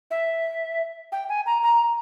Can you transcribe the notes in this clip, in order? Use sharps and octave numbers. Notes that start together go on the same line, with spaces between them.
E5
G5
G#5
A#5
A#5